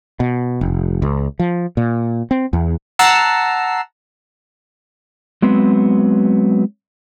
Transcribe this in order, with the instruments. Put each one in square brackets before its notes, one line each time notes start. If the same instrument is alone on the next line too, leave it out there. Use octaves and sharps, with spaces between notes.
[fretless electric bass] B2
F1
C#2
F3
A#2
C4
E2
[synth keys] F#5 A5 A#5 E6 C7
[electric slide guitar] F#3 G#3 B3 C4